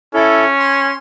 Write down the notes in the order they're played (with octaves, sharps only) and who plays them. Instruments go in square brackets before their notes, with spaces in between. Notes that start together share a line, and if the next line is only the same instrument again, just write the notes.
[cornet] C#4 [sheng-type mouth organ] E4 A4
[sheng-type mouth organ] C6